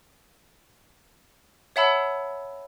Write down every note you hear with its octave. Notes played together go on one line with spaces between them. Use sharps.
C#5 E5 F#5 A5 B5 E6